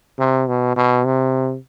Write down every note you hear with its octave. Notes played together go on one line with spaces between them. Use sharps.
C3
B2
B2
C3